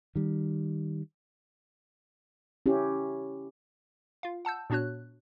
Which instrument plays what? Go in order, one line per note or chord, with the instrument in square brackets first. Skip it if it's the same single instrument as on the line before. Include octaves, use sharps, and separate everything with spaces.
[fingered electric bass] D#3 G3
[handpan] C#4 E4 G4
[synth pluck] F4 F5
F#5 A5 E6 G6
A#2 B3 D4 F#4 C#5 F#6